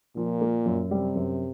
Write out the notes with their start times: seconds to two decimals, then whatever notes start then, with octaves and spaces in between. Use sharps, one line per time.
0.16 A#2 F3
0.41 A#3
0.66 F#2
0.91 C3 G3
1.16 F#2